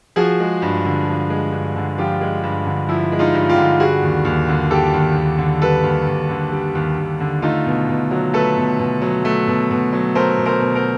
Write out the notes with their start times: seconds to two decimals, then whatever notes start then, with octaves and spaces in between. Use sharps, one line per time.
0.16 F3 F#4 G#4
0.40 G#3
0.62 G2
0.85 D3
1.08 F3
1.30 G#3
1.52 G2
1.76 D3
1.98 F3 F4 G4
2.21 G#3
2.43 G2
2.66 D3
2.89 F3 E4
3.12 G#3
3.19 D#4 F4
3.34 G2
3.49 F4 G4
3.56 D3
3.80 G3 F#4 G#4
4.02 D#2
4.25 D#2
4.48 D3
4.70 G3 G4 A4
4.94 D#2
5.16 D#2
5.38 D3
5.61 G3 A4 B4
5.83 D#2
6.07 D#2
6.30 D3
6.52 G3
6.75 D#2
6.98 D#2
7.20 D3
7.42 A3 D#4 F4
7.66 B2
7.88 B2
8.11 F#3
8.33 A3 A4 B4
8.57 B2
8.79 B2
9.02 F#3
9.25 A3
9.47 B2
9.71 B2
9.93 F#3
10.15 A3 A#4 C5
10.38 B2
10.46 A#4 C5
10.60 B2
10.75 A#4 C5